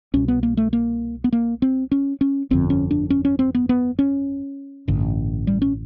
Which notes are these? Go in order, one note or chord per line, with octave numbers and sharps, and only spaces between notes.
C2 B2 C#4
B3
A#3
A3
A#3
B3
A#3
C4
C#4
C#4
G1 F2 D3 C4
C#4
D4
C#4
C#4
C4
B3
B3
C#4
A1 G2 D3
G3
C#4